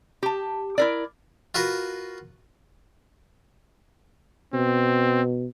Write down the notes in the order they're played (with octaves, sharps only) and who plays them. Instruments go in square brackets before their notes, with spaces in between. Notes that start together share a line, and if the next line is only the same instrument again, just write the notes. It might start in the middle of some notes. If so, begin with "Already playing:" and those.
[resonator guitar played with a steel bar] G4 A5
E4 A#4 D5
[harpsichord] F4 F#4 A#4 B4
[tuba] B2 [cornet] C4